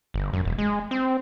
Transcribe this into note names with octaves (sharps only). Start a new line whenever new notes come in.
G1
F#2
E1
G#3
C4